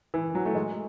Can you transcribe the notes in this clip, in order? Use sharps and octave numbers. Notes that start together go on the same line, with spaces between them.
E3
F#3
A3
G#3